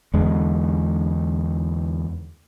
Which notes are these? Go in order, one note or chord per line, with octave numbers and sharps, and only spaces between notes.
E2 D3 G#3